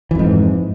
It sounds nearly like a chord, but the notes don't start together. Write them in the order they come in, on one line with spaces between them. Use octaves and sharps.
E3 F2 G#2